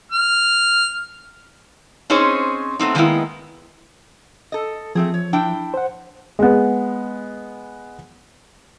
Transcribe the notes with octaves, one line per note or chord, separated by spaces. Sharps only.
F6
C4 C#4 D#4 G#4 C5 C#5
A3 B3 C4 D#4
D3 D#3 G#3 A#3 B3 E4
A4 D#5
F3 A3 C4 G#4
C#5
D4 E4 G5
C5 F#5
G#3 B3